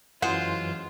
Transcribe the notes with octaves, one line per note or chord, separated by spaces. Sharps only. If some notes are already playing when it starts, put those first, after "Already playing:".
F#2 E3 F#3 G#3 F4 C5 F#5